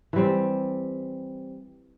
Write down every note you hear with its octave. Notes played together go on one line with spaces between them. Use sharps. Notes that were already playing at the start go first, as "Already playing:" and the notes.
E3 G3 C4